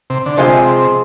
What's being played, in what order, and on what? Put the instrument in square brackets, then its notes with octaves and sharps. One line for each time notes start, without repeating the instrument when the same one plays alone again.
[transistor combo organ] C3
D3
[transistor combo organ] C3 [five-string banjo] F3 G#3 C4 F4 G#4